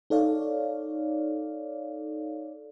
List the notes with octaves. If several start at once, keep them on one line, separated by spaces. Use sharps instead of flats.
D#4 A4 C#5 D5 F5